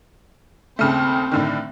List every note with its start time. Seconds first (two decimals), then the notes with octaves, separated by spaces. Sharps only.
0.79 D#2 C#3 A3 C4
1.32 A2 D3 D#3